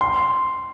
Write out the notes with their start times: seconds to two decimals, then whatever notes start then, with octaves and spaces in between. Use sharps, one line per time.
0.01 C6